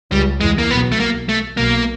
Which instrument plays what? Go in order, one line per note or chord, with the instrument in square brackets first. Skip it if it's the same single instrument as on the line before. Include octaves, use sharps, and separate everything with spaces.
[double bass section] C#2 C#3 [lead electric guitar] G3
[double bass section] E2 E3 [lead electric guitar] G#3
[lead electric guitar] A#3
[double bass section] B1 B2 [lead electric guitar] B3
[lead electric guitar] A3
A#3
A3
[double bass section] B1 B2 [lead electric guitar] A#3